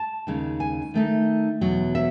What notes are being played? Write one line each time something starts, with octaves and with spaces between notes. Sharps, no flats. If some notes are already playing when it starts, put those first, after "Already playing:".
Already playing: A5
D#2 C#3 G#3 D#4
G#5
D#3 A3 D#4
E2 B2 F#3
E5